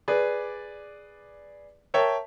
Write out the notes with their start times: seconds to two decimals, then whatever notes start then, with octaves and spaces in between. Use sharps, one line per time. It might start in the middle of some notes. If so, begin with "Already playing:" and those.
0.08 G#4 B4 D5
1.94 A#4 C#5 E5 G5 A5